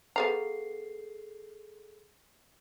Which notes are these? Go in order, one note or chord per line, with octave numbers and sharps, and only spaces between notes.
B3 G#4 A4 F5 A#5 C7